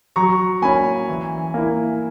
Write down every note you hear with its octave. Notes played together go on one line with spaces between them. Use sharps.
F#3 A#5 C#6
A#3 C#4 G#5 B5
E3
A#3 E4